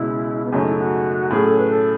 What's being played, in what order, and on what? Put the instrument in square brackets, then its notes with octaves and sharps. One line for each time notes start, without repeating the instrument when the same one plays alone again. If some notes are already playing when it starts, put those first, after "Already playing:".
Already playing: [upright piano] C#2 B2 G#3 C#4 [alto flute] E4
[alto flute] B3
[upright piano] F#2 C#3 F#3 A3 D#4 [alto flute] C#4
[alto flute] E4
F#4
[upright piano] A2 F#3 A3 C#4 G#4
[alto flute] A4
B4
A4